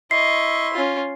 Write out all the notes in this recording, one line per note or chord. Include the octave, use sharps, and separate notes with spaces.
E4 D#5 E5 C6 C#6 C7
C#4 F4